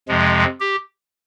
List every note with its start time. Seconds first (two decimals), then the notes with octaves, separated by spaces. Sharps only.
0.08 F2 C3 F3 G#3
0.60 G4